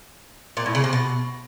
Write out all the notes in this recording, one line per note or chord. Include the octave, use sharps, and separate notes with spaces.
A#2
A2
C#3
C3
B2